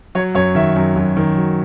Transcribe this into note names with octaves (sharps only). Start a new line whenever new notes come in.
F#3 C#5
F#2 C#5
D#3 E5
F#2
F#2
D#3
F#3